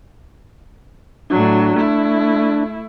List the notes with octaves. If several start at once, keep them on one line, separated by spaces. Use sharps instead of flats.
A2 F#3 D4
A3 E4